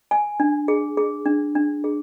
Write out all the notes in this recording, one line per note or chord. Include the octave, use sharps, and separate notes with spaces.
G#5
D4
G#4
G#4
D4
D4
G#4